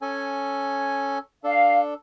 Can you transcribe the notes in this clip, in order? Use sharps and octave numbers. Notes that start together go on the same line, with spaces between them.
C#4 A4 G#5
D4 A4 F5